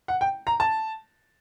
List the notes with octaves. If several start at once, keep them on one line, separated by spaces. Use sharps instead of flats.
F#5
G5
A#5
A5